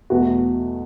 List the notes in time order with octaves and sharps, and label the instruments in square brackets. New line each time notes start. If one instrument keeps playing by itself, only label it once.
[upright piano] E2 B2 A3 F#4